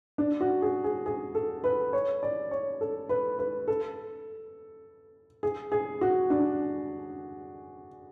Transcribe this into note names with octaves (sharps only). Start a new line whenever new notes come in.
D4
F#4
G#4
G#4
G#4
A4
B4
C#5
D5
C#5
A4
B4
B4
A4
G#4
G#4
F#4
D4